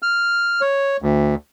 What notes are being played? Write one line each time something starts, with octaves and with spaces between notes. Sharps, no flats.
F6
C#5
D2